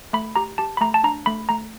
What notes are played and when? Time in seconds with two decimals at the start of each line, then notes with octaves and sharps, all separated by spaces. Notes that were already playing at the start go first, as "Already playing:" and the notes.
0.13 A3 B5
0.36 G4 A#5
0.58 G4 A5
0.77 B5
0.81 A3 A#5
0.94 A5
1.04 D4 A#5
1.26 A3 B5
1.49 A3 A#5